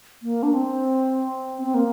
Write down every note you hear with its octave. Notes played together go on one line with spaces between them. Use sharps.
A#3
D4
C4
C4
A#3